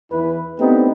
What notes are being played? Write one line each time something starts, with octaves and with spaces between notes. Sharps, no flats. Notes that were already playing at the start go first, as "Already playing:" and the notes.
E2 E3 E4 B4
A3 B3 C4 D4 D#4 G4